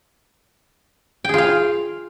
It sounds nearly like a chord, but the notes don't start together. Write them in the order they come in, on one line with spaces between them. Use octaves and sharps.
G5 G#4 F4 F5